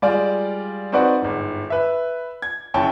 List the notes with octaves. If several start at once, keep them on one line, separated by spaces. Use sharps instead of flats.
G3 G#3 F4 D5
C4 D#4 F#4 B4 D5 F#5
G1 G#2
B4 E5
G#6
F#1 C#4 E4 C#5 G5 A5